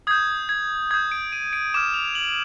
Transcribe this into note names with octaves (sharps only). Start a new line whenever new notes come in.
D#6 G6 G#6
G#6
D#6 G6 G#6
D7
D#7
D7
D6 F6 E7
F7
F#7